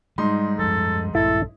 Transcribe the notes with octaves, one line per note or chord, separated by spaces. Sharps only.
G#2 G3 D#4 C6
F#2 F3 G3 A4
A#1 G2 E4 A4